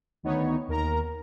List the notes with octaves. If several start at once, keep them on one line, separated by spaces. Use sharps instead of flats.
D2 D#3 B3 D#4 C#5
D#2 A#4 A#5